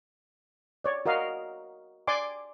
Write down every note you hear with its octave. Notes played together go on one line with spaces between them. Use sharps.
C#5 D5
F#4 A#4 D#5 F5
D5 G#5 C6 D6